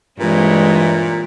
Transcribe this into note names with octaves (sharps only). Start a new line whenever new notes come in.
G2 A#2 E3 G#3 C4 E4 C#5